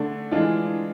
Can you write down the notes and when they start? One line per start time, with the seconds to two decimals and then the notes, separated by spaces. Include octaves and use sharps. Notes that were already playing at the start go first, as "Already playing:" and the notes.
Already playing: D3 A3 D4
0.31 E3 G#3 D4 F4